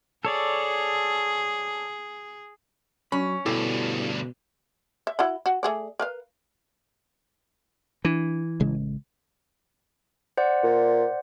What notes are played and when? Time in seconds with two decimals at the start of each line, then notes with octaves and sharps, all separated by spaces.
0.25 G#4 A4 C#5 D5
3.12 F#3 C#4 B5
3.46 D2 G2 B2 E4 G4 A4
5.07 E5
5.19 E4 F#4 B5
5.46 F#4
5.63 A3 G#4 D5
6.00 A#4 B4 F5
8.05 E3 D4
8.60 A1 C#3 G#3
10.37 C5 D5 F#5
10.63 A#2